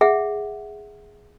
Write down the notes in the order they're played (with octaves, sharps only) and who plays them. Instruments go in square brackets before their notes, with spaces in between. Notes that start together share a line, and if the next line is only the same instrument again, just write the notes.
[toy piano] G#4 E5 F#5